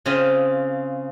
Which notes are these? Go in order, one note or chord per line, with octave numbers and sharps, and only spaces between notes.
C#3 C4 F4 D#5 E5 C6